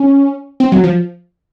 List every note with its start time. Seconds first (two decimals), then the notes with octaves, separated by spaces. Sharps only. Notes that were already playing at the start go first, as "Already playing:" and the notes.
Already playing: C#4
0.60 C4
0.72 F#3
0.84 F3